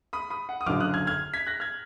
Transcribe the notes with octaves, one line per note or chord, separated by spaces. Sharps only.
B5 D#6
B5 D#6
F#5
D#6
F#1 F#2 D3 F#3 D6 F6
D#6 F#6
F6 G#6
F6 G#6
G#6 B6
F#6 A#6
F6 G#6